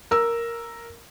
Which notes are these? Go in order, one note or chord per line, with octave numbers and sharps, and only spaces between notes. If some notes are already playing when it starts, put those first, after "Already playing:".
A#4 E6